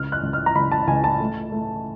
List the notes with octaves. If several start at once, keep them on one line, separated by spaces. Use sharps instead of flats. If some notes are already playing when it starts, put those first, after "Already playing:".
Already playing: C#2 F6
F#6
C#2
F6
A#5
C#2 B5
A5
C#2 G#5
A5
A3
A3